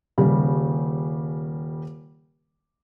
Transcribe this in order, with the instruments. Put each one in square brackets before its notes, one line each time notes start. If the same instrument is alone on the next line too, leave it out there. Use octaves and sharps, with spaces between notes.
[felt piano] D#1 C#3 G3